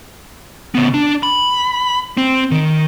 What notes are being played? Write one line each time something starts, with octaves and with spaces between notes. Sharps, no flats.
C#3 B3
D4
B5
C4
D#3